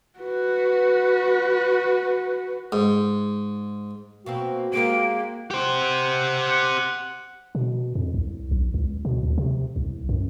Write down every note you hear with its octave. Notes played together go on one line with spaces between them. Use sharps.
F#4 B4
G#2
B2 A#3 C4 F#4
G#3 A#3 G4 A#4 D7
G4 C5 F#5
B2
F2
C2
B1
C#2
B2
D2
C3
C2
F#2